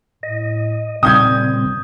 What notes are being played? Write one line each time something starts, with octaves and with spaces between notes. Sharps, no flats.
A2 D#5
A#2 C#3 G3 C4 D#6 G6 G#6